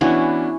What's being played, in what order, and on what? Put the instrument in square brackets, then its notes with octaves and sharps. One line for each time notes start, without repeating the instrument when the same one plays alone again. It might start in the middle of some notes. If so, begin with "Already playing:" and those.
[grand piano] E3 B3 D4 F#4 [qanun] C#4 E4